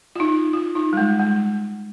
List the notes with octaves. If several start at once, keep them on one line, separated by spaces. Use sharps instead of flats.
F4
D#4
F4
D#4
G3
G#3
G#3